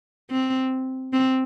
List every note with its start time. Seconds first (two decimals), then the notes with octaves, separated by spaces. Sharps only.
0.31 C4
1.13 C4